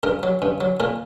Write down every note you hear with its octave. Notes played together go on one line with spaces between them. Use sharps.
G2 A#4
F#3
G2
F#3
A#2 A#4